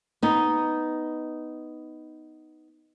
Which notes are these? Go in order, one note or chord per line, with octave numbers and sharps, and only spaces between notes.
B3 D#4